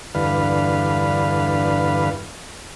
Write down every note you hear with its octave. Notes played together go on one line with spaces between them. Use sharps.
E2 G2 D3 B4 F5